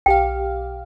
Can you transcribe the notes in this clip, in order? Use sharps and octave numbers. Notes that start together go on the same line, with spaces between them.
B1 G4 F5 G5